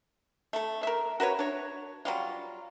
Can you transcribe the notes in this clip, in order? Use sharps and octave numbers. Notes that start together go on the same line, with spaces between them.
A3 A4
A#4 E5
F#4 A#4 B4 C#5
D4 C#5
F#3 G3 F4